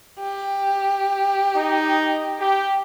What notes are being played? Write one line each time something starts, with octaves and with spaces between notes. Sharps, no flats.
G4
D#4
G4